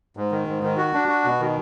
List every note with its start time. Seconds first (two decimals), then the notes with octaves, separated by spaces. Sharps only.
0.17 G#2
0.32 D#3
0.47 G#2
0.63 D#3
0.77 F#4
0.93 D4
1.08 F#4
1.24 B2
1.40 D#3